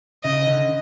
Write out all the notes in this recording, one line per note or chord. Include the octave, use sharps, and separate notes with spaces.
C#3 D#5
D3